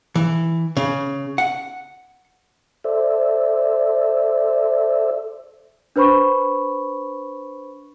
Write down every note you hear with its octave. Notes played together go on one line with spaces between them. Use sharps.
E3
C#3
F#5
A4 C5 D5 E5
D4 B4 C5 B5 C#6